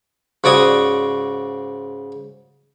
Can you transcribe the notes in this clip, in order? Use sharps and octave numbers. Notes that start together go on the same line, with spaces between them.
G#2 C#3 F#4 D5 G#5 D#6